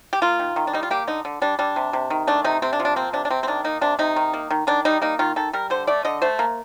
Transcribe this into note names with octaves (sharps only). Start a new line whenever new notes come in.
G4
A#3 F4
D#3
D#3
D4
G3 D#4
F4
A#3 G4
D3 D#4
D3
G3 D4
G3 D4
C3
C3
D#3
A3 D4
C3 D#4
C3 C4
D4
F3
D4
A#3 C4
C3 D4
D4
C3 C4
C4
D#3 D4
A#3 D#4
C3 D4
C3 D#4
D#3
A#3
D#3
D#3 D4
G3 D#4
A#3 D#4
D#3 F4
D#3 A4
G3 A#4
D3 C5
A3 D5
D3 D#5
A3 C5
A#3